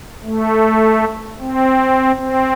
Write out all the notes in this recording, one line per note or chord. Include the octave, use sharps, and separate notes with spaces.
A3
C4
C4